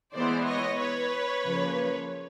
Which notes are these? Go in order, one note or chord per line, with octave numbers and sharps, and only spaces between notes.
E3 G#3 B3 E4 C5 D5
C#5 D#5
B4 C#5
C#3 F3 A#3